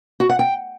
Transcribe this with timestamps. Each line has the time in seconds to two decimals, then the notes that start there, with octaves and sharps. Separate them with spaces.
0.20 F#4
0.29 F#5
0.39 G5